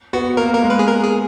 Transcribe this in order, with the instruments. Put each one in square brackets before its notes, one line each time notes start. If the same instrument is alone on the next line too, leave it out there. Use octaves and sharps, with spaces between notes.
[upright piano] B3 [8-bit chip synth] F#4
[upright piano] A#3 [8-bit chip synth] A#4
[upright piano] A#3 [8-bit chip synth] A#4
[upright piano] G#3
[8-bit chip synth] B4
G#4
A#4
G#4